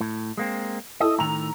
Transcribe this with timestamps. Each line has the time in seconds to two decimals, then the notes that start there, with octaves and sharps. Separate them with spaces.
0.01 A2
0.37 G#3 A#3 C4
1.00 E4 A4 D#5 E6
1.19 A2 D#3 A#5 F7